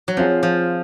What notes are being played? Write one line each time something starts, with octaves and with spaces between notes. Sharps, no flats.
F#3
F3 C4 F4 G#4
F3